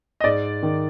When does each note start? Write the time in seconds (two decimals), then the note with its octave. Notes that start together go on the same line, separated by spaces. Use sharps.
0.20 D#5
0.24 G#2 D5
0.62 D#3